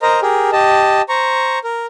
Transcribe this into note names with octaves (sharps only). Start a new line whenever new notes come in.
A#4 C5 D#5 A#5
G4 G#4 A#4
G4 D#5 A5
C5 A#5 C#6
A#4